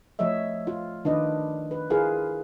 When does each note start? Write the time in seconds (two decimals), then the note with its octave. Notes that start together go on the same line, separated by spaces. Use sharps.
0.19 F3 A3 C#5 D#5 E5
0.67 F4
1.05 D#3 D4 F4 B4 D5 D#5
1.71 B4
1.90 E4 F4 G#4 A#4 B4 F5